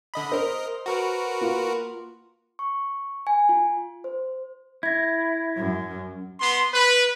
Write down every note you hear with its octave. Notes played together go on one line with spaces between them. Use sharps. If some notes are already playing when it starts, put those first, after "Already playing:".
D3 D#5 B5
A#4 C5 D#5
F#4 A#4 B4
A#3 F4
C#6
G#5
F4
C5
E4 G#6 A#6
F#2
B3 C6
B4